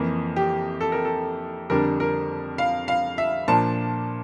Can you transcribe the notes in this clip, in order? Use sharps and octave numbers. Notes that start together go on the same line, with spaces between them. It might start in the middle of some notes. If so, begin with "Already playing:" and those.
Already playing: F2 E3 A#3
G4
A4
A#4
A4
F2 D3 G3 D4 A#4
A#4
F5
F5
E5
A#2 F3 A#3 D4 A5